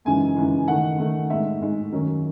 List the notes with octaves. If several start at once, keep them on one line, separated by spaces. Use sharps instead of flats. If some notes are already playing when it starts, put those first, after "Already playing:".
F#2 C#3 E3 G#3 D#4 G#5
F#2 C#3 E3 G#3 D#4
D#3 A3 D#4 F#5
D#3 A3 D#4
A2 G#3 D#4 E5
A2 G#3 D#4
F#2 D#3 F#3 C#4